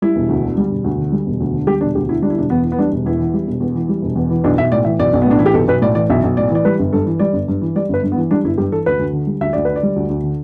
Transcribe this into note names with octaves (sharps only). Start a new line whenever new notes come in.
G3 E4
E1
D2
D3
G3
E1
D2
D3
G3
E1
D2
D3
G3 G4
E1 D4
D2 G4
D3 E4
G3 D4
E4
E1 D4
E2 B3
E3
B3
G3 D4
E1
E2 E4
E3
G3
E1
E2
E3
G3
E1
E2
E3
B1 D4
B1 E5
A2 D5
E3 E5
B1 D5
B1
B3
A2 D4
E3 E4
G4
B1 A4
B1 B4
A2 D5
E3 D5
B1 E5
B1
A2 D5
E3 D5
G3 B4
G1
G2 A4
E3
G3 D5
G1
G2
E3
G3 D5
G1 B4
G2
B3
E3
G3 D4
G1 E4
G2 G4
E3 A4
D2 B4
D2
D3
G3
D2 E5
D2 D5
D3 B4
D5
G3
D2
D2
D3